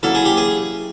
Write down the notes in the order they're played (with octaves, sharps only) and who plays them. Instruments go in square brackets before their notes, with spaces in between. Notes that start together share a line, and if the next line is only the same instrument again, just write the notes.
[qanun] F#3 A#3 C#4 E4 [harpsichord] A4
[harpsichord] G#4
G4
G#4